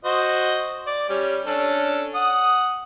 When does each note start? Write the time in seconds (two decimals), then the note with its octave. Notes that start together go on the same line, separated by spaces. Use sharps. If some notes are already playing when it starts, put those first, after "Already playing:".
0.05 F#4 C5 D#5
0.87 D5
1.10 G3 C#4
1.46 C#4 D4 A4
2.15 F#5 D#6